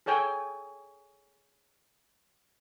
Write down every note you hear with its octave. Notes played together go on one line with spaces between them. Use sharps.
G#4 A4 C#5 G5 G#5